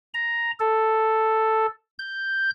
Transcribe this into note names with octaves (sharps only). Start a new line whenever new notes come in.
A#5
A4
G6